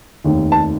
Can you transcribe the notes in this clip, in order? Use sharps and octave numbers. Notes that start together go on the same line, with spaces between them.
F1 D#2 D#3
A5